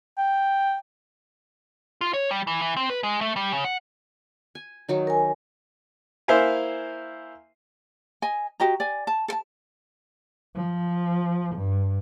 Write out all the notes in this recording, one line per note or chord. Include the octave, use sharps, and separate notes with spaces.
G5
F4
C#5
G3
E3
E3
C4
B4
G#3
A3
G3
C#3
F#5
G#5
D#3 F#3 D#4
A#4 G#5
A#3 E4 C5 E5 F5 G#5
D#5 G#5
F#4 G4 D#5 A#5
D5 G#5
A5
A4 A5
F3
G2